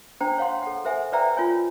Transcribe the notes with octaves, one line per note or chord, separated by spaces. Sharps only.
D4 C5 G5 A#5
C#5 F5 F#5 C6
A4 F#5
A4 A#4 C5 E5 F#5 G#5
B4 C5 D5 E5 G5 A#5
F4 A#4 C#5 G#5